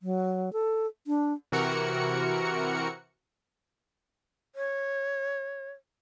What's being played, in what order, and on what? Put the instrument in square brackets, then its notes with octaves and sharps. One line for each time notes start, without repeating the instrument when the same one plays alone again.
[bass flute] F#3
A4
D4
[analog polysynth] C3 E3 F#4 A#4 C#7
[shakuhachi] C#5